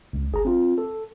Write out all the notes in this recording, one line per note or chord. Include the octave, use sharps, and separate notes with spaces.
C#2
G1 G#4 A#5
C4 F4
A4